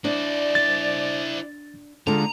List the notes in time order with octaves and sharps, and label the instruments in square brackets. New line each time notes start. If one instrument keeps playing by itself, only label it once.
[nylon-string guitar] D4 [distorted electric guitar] E4 C5 [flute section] D5
[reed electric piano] A6
[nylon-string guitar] D3 G#3 [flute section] F4 [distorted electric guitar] A#5